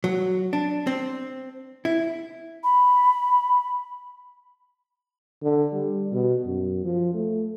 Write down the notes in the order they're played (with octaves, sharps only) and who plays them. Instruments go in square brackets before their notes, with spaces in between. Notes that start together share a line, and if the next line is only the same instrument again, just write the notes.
[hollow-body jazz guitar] F#3
D4
C4
E4
[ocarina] B5
[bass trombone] D3
G3
B2
F#2
F3
A3